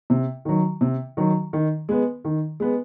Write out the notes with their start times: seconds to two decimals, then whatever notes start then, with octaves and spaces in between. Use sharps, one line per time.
0.10 C3
0.45 D#3 F#3
0.81 C3
1.17 D#3 F#3
1.53 D#3
1.89 G#3 B3
2.25 D#3
2.60 G#3 B3